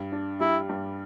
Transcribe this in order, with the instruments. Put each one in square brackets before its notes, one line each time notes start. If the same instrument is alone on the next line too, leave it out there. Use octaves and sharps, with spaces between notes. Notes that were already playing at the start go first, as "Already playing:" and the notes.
Already playing: [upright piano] G2
D4
[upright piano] G3 [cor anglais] E4
[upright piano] G2